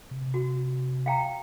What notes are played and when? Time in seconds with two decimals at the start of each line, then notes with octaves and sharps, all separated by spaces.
0.11 C3
0.34 F#4
1.06 F5 G5 A#5